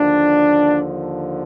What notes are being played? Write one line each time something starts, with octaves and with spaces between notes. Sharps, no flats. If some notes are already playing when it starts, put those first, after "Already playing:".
Already playing: D#2 D3 F3 D4